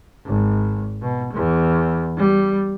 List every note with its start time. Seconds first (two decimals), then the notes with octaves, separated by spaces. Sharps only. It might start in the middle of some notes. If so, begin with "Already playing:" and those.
0.26 G#1
1.02 B2
1.33 E2
2.18 G3